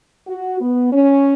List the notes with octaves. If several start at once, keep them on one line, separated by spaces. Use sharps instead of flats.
F#4
B3
C#4